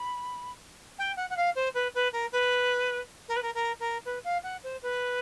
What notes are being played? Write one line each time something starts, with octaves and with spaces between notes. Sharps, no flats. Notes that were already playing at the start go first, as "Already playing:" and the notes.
Already playing: B5
G5
F#5
F#5
F5
C5
B4
B4
A#4
B4
A#4
B4
A#4
A#4
A#4
B4
F5
F#5
C5
B4